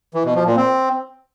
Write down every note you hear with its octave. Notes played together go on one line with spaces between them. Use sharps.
E3
B2
F3
A#2
C4